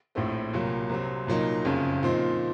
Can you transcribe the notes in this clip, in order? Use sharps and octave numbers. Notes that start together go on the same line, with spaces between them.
A#1 A2 A3 C4
C2 A#2 F#3 A#3
C2 C3 F#3 C4
C2 A#2 F#3 A#3 D#4
F#1 F2 C#3
A#2 F3 C4 D#4